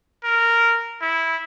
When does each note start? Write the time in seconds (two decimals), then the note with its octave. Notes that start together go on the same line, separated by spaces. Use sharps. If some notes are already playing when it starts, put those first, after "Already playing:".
0.24 A#4
1.01 E4